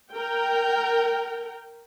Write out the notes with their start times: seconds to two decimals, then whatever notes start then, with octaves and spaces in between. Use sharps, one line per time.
0.12 A#4 G5